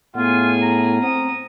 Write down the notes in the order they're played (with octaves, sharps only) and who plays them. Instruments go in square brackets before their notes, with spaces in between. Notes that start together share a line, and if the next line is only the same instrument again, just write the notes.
[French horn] A2 [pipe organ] B3 [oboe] F4 [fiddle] G#4 G#5
[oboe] A#5
[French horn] C4 [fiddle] D#6